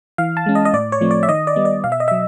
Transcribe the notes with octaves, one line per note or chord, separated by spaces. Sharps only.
E3 F5
A5
G#3 C#4
D#5
D#5
A2 D5
C#5
F3 A3 C4
D5
E5
D#3 D#5
D5
G3 B3
D5
B2 F5
E5
D#5
F#3 E5